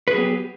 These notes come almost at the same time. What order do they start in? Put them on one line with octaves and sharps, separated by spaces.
B4 G#4 F#3 B3 G4